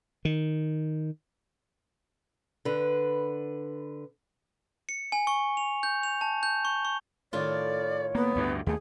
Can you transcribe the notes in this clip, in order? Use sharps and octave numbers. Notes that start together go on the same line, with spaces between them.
D#3
D3 B4
C#7
G#5
C#6
F7
G6
F7
A5
G6
C#6
C#6
A2 D#3 F4 C#5 D5
A#3 B3
D2 G2
D#2 A3 G#4